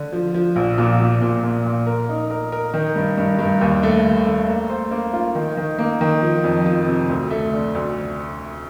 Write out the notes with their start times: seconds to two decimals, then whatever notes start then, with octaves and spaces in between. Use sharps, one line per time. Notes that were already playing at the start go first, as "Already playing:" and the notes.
Already playing: D3
0.12 F3
0.34 F3
0.56 A#1
0.78 A#2
1.00 A#2
1.21 A#2
1.43 A#2
1.65 A#2
1.87 A#4
2.09 D#4
2.30 A#4
2.52 A#4
2.74 D#3
2.96 G2
3.18 G2
3.39 G2
3.61 D#2
3.83 A3
4.04 D#2
4.26 A3
4.48 A#3
4.69 C5
4.91 A#3
5.13 F4
5.35 D#3
5.57 D#3
5.79 A#3
6.01 D#3
6.22 F3
6.44 F2
6.66 F3
6.88 C3
7.09 D2
7.31 A3
7.53 D3
7.75 D2